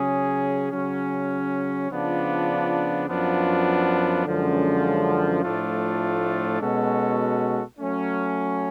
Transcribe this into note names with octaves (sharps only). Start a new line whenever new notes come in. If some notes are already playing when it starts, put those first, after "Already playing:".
Already playing: C#3 F#3 C#4 G#4
C#3 F#3 C#4
C#3 F3 B3 D4 F4
F#2 F3 B3 D4 F4
F#2 D3 F3 G#3 C#4
A2 F3 A3 D4 F4
B2 G#3 C#4 F#4 A4
F#3 A3 C#4